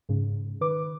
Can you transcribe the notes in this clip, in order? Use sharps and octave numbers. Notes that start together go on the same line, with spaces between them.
G#2 C#3
D#3 B4 D6